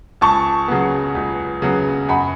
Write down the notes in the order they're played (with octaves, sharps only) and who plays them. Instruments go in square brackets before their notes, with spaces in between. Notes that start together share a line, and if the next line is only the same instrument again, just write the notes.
[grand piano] C#2 [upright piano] A5 C#6
[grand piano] C#3 F#3 B3
C#2
C#3 F#3 B3
[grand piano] F#2 [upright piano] F#5 B5